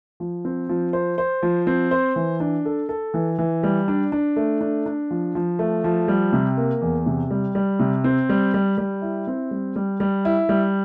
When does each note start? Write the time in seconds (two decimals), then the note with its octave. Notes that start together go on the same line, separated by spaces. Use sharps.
0.20 F3
0.45 C4
0.69 F3
0.93 C5
1.18 C5
1.42 F3
1.67 C4
1.91 C5
2.16 E3
2.40 D4
2.65 A4
2.89 A4
3.14 E3
3.38 E3
3.63 G3
3.88 D4
4.12 D4
4.36 A3
4.61 D4
4.86 D4
5.11 F3
5.35 F3
5.59 A3
5.84 F3
6.08 G3
6.33 C3
6.57 A#3
6.82 E2
7.06 C3
7.31 G3
7.55 G3
7.80 C3
8.04 C4
8.29 G3
8.54 G3
8.78 G3
9.02 E4
9.27 C4
9.51 G3
9.76 G3
10.00 G3
10.25 E4
10.49 G3